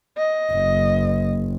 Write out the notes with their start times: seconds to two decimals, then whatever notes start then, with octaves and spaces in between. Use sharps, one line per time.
0.17 D#5
0.52 F#1